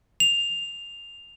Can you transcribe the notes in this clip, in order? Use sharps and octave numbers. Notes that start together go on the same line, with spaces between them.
F7